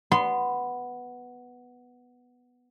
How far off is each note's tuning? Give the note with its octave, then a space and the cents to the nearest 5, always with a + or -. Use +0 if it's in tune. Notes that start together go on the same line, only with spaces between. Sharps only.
B3 +0 C6 -20